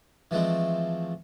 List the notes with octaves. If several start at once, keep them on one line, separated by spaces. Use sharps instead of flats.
E3 F3 G#3 A3 C4